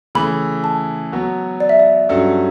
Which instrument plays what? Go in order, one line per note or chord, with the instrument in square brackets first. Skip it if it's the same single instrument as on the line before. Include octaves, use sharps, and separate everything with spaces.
[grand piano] C#3 E3 A3 [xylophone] B5
[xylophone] A5
[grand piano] F#3 B3 F#4
[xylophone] D5
E5
D5
[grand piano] G2 F#3 C#4 F#4 A4